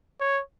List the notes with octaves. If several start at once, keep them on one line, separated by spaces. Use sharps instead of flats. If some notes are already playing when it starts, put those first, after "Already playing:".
C#5